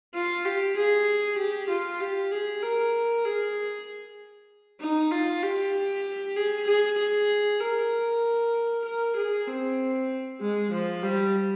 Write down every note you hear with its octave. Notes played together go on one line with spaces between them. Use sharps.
F4
G4
G#4
G4
F4
G4
G#4
A#4
G#4
D#4
F4
G4
G#4
G#4
G#4
A#4
A#4
G#4
C4
G#3
F3
G3